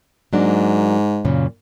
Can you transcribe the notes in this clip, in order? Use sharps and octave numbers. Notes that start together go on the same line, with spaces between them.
G#2 F#3 A#3 D4
F#2 A#2 C#3